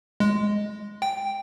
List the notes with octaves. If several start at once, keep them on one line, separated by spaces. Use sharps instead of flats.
G#3
G5